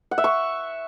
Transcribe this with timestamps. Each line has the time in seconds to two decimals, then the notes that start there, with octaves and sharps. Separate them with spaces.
0.11 F#5
0.18 E5
0.24 C#6